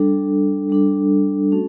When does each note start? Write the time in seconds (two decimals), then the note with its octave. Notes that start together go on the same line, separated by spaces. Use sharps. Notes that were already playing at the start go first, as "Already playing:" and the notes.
Already playing: G3 D4 A4
0.70 G3 D4 A4
1.52 A3 C#4 F#4 A4